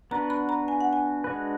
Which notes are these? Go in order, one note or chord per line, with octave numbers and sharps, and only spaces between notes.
B3 D4 F#4 B4 A#5
B5
A#5
G#5
F#5
G#5
G#3 D4 F#4 B4